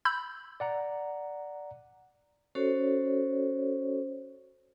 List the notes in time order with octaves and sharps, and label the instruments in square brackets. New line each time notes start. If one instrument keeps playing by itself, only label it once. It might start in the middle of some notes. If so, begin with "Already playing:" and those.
[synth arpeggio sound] B5 E6 G6
[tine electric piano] D5 F#5 A#5
[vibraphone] C#4 F#4 A4 C5 C#5